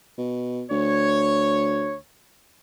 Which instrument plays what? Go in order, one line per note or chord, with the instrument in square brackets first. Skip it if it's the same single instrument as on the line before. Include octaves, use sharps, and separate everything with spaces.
[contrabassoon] B2
[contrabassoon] D2 [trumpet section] C#5